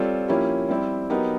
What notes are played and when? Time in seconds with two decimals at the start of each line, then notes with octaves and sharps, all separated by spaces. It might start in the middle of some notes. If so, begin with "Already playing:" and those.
Already playing: G3 C4 F4 A4 C#5
0.28 F3 A#3 C#4 E4 G4
0.69 G3 C4 E4
1.10 F#3 B3 D#4 G4 A#4